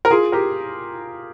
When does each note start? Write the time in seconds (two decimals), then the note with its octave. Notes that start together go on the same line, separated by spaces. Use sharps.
0.05 A#4
0.11 F4 G#4
0.32 G4 A#4